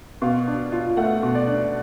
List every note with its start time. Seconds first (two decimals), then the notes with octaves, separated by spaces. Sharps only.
0.22 B2 F5
0.47 D4
0.72 F4
0.97 A3 F#5
1.23 B2
1.35 D5
1.47 D4